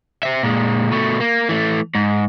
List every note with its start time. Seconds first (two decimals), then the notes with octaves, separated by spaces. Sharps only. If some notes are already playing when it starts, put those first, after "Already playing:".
0.23 C5 E5
0.43 A#2 G#3
0.92 B2 A3
1.20 A#3
1.49 E3 A3
1.95 G#2